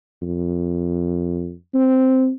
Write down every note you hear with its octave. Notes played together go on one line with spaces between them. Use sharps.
F2
C4